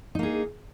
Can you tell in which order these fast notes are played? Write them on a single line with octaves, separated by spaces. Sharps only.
D#4 A#3 G#4